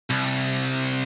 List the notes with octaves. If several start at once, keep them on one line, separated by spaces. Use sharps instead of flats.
C2